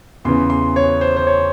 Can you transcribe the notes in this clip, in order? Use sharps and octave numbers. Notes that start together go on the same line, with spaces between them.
E2 C#3 E3 C6
C6
C#5
C5
C5
C#5